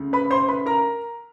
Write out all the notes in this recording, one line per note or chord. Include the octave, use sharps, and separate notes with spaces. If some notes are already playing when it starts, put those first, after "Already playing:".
Already playing: D2 C#3
B4 B5
C5 C6
B4 B5
A#4 A#5